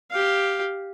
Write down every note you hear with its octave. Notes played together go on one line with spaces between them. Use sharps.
G4 F5